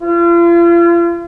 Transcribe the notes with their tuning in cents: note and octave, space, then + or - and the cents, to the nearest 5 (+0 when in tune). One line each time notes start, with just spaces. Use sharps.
F4 -40